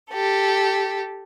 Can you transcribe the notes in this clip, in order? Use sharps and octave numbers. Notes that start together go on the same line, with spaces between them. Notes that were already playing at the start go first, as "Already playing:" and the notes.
G4 A4